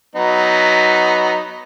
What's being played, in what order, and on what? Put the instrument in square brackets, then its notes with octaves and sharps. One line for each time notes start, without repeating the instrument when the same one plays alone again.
[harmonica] F#3 B3 D#4